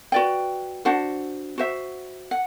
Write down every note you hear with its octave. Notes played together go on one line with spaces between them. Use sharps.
F#4 B4 D5 G5
D4 F#4 C5 F#5
F#4 C5 E5
F#5